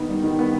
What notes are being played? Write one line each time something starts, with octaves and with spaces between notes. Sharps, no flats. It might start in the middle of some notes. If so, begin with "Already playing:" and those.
Already playing: D#3 B3 D#4
G3
D#3
B3